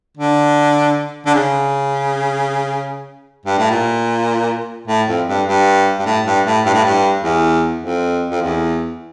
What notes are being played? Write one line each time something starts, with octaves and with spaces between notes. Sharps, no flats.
D3
D3
C#3
G2
A2
A#2
A2
F2
G2
G2
G2
A2
G2
A2
G2
A2
G2
E2
F2
F2
E2